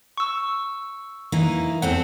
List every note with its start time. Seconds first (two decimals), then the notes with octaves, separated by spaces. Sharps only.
0.18 C#6 E6
1.32 E3 A#3 D#4
1.82 E2 C4 A4 F#5